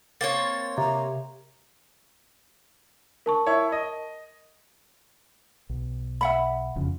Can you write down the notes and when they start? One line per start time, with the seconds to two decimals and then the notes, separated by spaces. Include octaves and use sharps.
0.21 A#3 C4 C#5 A6
0.78 C3 A#5
3.26 A#4 A5 C#6
3.46 E4 C#5
3.72 D#5
5.70 B1
6.21 E5 F#5 B5
6.75 E1 F2 C#3